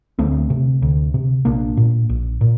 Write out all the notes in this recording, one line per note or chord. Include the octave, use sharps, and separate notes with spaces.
D2 A3 C4
C3
D2
C3
A#1 A#3 D4
A#2
A#1
A#2